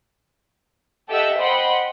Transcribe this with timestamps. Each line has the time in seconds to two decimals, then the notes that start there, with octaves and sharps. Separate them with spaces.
1.09 G4 A4 D#5 E5 F#5 E6
1.40 C5 D#5 F#5 G5 B5 C6